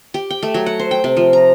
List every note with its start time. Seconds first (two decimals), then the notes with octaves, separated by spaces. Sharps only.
0.14 G4
0.30 G5
0.43 A3
0.54 F#3
0.66 F#5
0.80 C5
0.91 G5
1.04 C3
1.17 F3
1.33 A#5